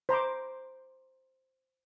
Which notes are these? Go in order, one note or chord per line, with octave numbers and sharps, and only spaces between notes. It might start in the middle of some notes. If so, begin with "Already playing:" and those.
C5 A#5 B5 D6